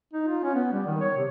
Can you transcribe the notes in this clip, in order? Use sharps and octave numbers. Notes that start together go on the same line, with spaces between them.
D#4
F4
C#4
B3
G3
D#3
C#5
C3